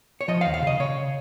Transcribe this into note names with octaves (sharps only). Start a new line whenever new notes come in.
C#5
F3 D#5
F5
D#2
F5
C#3 D#5
C#3 C#5